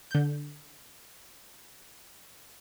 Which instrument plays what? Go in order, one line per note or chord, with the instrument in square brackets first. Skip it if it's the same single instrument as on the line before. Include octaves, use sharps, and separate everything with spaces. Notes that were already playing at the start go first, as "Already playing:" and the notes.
[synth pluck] D3 G6